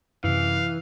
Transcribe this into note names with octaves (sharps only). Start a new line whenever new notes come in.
F#2 C3 E3 F5